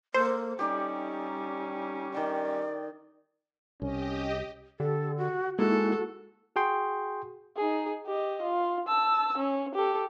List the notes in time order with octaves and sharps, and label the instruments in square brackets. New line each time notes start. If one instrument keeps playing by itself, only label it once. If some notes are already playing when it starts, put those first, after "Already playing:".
[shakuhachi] A#3 [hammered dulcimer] A4 [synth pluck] C5
[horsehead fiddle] G3 C#4 [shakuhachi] D#4 [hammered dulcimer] G4 D5
[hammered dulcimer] D#3 G5 D6 [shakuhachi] D5
[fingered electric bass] C2 [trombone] C#4 [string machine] G4 D#5
[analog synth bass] D3 [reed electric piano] G4 [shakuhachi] A4
[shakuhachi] F#4
[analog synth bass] G#3 [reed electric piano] A#3 D#4 E4 [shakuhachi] F#4 [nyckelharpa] A4
[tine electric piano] F#4 G#4 G5 C6
[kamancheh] D#4 G#4
G4 D#5
F4
A5 E6
C#4
G4 A4